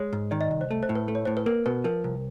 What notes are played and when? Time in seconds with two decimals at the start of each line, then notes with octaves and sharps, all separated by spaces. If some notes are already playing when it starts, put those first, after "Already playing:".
Already playing: G#3 C#5
0.13 G#2
0.31 D#3 D5
0.41 D#5
0.51 C2
0.61 C5
0.71 A3
0.83 C5
0.89 A2
0.95 B4
1.08 A3
1.15 C#5
1.25 A2 C5
1.37 B4
1.46 A#3 A#4
1.66 B2 B4
1.84 F3 A#4
2.04 C2